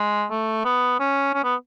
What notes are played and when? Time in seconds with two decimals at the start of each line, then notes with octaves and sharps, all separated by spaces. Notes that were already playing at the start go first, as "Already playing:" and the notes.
Already playing: G#3
0.30 A3
0.65 B3
1.00 C#4
1.34 C#4
1.44 B3